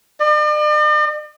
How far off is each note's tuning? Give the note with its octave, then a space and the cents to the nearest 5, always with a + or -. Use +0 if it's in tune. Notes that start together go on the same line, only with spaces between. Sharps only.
D5 +45